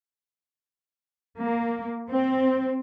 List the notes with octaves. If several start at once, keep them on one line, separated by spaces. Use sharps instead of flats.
A#3
C4